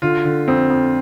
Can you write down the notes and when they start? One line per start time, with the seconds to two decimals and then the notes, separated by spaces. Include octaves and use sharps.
0.02 D3 F4
0.25 D3
0.48 F2 C4
0.70 F2